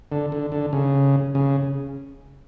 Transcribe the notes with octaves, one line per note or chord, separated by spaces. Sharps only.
D3
D3
D3
C#3
C#3